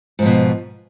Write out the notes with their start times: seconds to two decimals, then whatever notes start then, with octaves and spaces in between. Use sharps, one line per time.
0.19 G#2
0.22 F3
0.26 B2